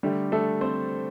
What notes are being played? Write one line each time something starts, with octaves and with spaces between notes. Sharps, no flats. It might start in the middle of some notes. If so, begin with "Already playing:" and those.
D3 G3 A3 G4
A3 A4
C4 C5